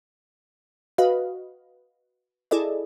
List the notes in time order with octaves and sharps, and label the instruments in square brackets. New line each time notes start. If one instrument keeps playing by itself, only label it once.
[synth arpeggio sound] F#4 B4 D#5 F5
E4 G#4 A4 D5 D#5